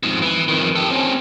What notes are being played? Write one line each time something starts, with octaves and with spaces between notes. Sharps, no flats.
F2 G#2
E3
F2 D#3
G4 A4
C4 C#4